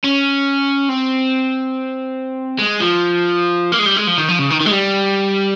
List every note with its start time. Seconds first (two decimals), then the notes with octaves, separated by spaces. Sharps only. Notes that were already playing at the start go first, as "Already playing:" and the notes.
0.04 C#4
0.89 C4
2.58 G#3
2.80 F3
3.72 A#3
3.79 G#3
3.86 G3
3.97 G#3
4.07 F3
4.18 D#3
4.29 F3
4.39 C#3
4.50 D#3
4.61 D#3
4.66 G#3
4.71 G3